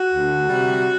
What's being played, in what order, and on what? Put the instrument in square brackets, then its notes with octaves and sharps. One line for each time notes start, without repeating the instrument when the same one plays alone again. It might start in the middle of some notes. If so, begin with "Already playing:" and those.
Already playing: [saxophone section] F#4
D2
C3 G3